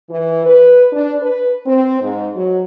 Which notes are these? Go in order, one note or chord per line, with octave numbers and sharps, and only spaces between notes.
E3
B4
D4
B4
C4
G#2
F#3